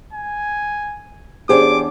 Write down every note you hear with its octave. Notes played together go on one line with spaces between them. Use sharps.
G#5
E2 C#4 D4 G4 G#4 C5 D6